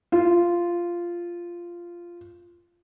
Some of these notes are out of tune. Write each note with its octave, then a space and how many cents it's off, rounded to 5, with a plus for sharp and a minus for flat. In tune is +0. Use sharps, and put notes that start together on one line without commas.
F4 -10